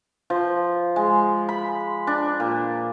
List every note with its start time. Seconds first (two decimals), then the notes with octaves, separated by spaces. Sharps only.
0.30 F3
0.96 G#3
1.49 B5
2.07 D4
2.40 A#2